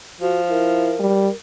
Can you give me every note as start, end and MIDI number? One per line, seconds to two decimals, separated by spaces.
0.21 1.00 53
0.21 0.41 66
0.50 0.93 64
0.50 1.35 70
1.00 1.29 55